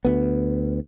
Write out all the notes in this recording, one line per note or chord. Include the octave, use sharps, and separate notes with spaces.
D2 B3